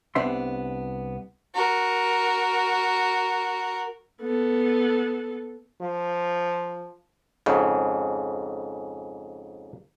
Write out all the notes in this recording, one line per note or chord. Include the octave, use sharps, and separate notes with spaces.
C2 B3 C4 D4 E5 C6
F#4 A#4
B3 A4
F3
F2 G#2 C#3